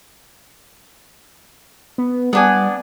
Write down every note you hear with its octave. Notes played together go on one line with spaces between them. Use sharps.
B3
G3 B3 D4 G#5